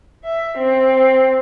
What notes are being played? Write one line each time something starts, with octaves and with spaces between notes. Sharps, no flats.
E5
C4